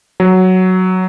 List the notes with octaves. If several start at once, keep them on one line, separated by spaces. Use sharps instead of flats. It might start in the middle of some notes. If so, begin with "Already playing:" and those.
F#3